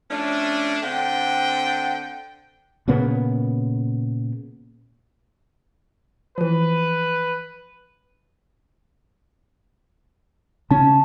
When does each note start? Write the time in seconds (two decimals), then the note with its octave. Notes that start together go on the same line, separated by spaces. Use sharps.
0.11 F3 A3 C#4 D4
0.83 D3 C4 F#5 G5
2.88 A#2 C#3 A#3 B3
6.38 E3 F3 B4
10.71 C#3 C#4 A5